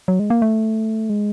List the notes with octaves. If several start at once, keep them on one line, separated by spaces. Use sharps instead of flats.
F#3
G#3
A#3
A3
G#3